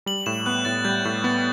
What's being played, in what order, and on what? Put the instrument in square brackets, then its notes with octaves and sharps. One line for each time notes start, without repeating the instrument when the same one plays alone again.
[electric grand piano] G3 [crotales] F#7
[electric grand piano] A2 [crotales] E7
[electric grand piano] B3 [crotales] F#6
[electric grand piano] A2 [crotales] A6
[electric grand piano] G3 [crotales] G6
[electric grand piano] A2 [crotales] F#6
[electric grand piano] B3 [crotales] A6